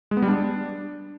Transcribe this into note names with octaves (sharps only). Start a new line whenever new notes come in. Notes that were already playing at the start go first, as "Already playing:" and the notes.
G#3
B3
G3
D4